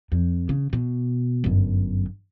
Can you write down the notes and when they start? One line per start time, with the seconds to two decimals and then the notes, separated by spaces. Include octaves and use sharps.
0.12 F2
0.49 C#3
0.73 B2
1.44 G1 F#2